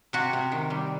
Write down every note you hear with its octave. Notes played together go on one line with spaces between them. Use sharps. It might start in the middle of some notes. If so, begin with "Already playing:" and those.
C3 F#4
C3
D#3
G3